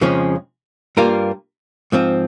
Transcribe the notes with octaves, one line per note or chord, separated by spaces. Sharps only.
F2 C#3 F3 G#3 C#4
G2 G3 A#3 F4 A#4
G#2 F3 C4